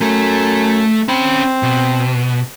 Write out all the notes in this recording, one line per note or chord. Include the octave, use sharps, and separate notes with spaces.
F#2 A3 A4
C4 C#4 B5
B2